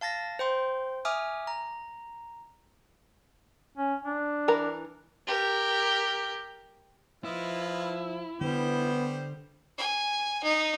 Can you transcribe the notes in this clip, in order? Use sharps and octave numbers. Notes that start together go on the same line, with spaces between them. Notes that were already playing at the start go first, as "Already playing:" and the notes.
F5 A5 A6 A#6
C5 G5 C6
E5 G#5 D6 D#6 F6
A#5
C#4
D4
E3 A#4 A#5
G4 A#4
F3 E4 F4 B4 D#5
D3 G3 B3 G4 C5
G#5
D#4